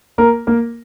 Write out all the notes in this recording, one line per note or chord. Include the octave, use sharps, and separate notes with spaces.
A#3 A#4
A#3 A#4